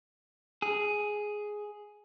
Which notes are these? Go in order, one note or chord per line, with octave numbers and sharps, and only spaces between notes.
G#4